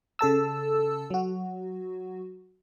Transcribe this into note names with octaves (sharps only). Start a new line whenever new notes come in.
C#3 A4 A5 E6
F#3 F#4